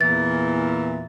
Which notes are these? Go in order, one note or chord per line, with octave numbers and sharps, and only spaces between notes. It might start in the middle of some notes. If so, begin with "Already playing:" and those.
E2 A#2 E3 A6